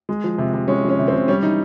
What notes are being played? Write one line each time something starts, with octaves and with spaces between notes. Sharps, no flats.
G#3
F3
C3
C3
G#3 C#4
F3
C#4
C3
C4
C3
G3 C#4
E3 D#4